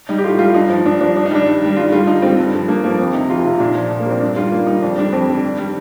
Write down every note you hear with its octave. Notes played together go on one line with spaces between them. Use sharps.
G3 D#4
G4
A2 F4
G3 F4
G2 D#4
F3
G2 D4
F3 D4
G2 D4
D#4
D#3 G3 D4
G2
D#3 G3
G2 F4
D3 G3 F4
G2 D#4
D3 G3 C4
G2
D3 F3
G2 A#3
D3 F3 A#3
F2 C4
C3 D#3 D#4
F2 F4
C3 D#3 F4
A#2 D4
F3
A#2
A#3
F3 C4
G2 D4
D#3 G3 F4
G2 A#3
D#3 G3 D#4
F2 D4
D3 G3 D4
F2 C4
D3 G3
G2
D#3 G3